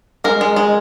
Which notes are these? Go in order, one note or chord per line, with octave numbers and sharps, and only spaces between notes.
G#3 A#4
G#3
G#3